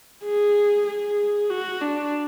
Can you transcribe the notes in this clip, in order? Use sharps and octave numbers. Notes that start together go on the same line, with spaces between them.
G#4
G#4
F#4
D4